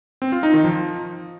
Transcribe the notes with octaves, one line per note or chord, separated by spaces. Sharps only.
C4
F4
D#4
D#3
F3